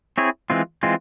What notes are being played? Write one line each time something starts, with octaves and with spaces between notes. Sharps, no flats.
C4 E4 G#4 C#5
E3 G#3 C4 F4
E3 G#3 C4 F4